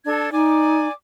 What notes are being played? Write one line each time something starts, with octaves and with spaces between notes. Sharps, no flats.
D4 A4 G#6
D#4 D5 G#5 D6